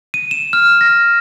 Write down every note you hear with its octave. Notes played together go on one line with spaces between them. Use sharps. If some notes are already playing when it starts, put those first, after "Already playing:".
D#7
E7
F6
A#6